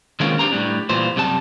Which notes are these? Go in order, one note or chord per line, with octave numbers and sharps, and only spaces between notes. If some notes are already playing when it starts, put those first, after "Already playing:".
D#3 G#3 A#3 C4 C#4 F4
D4 D#4 G4 C5 A#5
A2 G3 C#4 D4
A#2 E3 G3 F4 C5
F#2 C3 G3 A4 A5